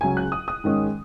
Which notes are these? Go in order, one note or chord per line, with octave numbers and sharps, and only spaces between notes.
C#2 C#3 F#3 C#4 G#5
F#6
D#6
D#6
G#2 D#3 G#3 C#4